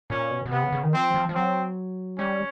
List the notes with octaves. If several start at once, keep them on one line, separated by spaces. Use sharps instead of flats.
A#2 C#4
B2
B2
C3 B3
C#3
C#3
D#3
F3 C4
F3
F3
F#3 C4
G3 C#4